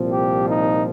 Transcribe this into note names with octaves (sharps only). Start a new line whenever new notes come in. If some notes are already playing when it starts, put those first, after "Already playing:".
Already playing: C2 A#2 F3 C4
G4
D#4